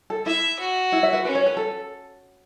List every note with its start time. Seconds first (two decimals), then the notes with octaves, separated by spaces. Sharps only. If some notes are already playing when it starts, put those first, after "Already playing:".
0.10 A4
0.26 E4 E5
0.59 F#4
0.92 E4
1.03 E5
1.13 B4
1.25 C#4 B4
1.35 C#5
1.46 B4
1.57 A4